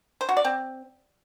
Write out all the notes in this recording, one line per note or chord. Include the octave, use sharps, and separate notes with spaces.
C5
F#4
D5
C4